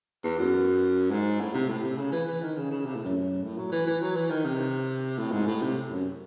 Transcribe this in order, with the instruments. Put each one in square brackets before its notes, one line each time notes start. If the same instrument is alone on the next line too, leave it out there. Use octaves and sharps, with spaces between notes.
[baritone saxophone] E2
F#2
G#2
A2
C3
A2
C3
C#3
E3
E3
D#3
C#3
C#3
C3
A2
F#2
A2
F#3
E3
E3
F#3
E3
D#3
C3
A2
G#2
A2
C3
F#2